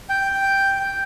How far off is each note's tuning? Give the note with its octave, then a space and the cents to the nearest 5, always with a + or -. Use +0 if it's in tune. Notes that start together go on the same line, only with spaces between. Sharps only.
G5 +0